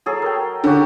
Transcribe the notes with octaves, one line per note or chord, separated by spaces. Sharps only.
F#3 G#4 A4
A#4 G5
D3 C#4 F#4 G4